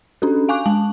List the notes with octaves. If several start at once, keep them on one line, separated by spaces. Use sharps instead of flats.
C#4 D4 F#4 A4
F5 G#5 C#6 D6 F#6
G#3 A5